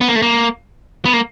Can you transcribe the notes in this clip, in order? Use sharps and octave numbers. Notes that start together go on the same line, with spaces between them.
B3
A#3
A3
A#3
B3
A#3